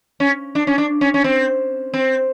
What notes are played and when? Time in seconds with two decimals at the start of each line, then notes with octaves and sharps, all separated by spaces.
0.20 C#4
0.55 D4
0.67 C#4
0.78 D4
1.01 C#4
1.14 C#4
1.24 C4
1.93 C4